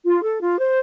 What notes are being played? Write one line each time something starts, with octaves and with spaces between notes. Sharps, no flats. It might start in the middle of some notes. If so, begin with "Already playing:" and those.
F4
A4
F4
C5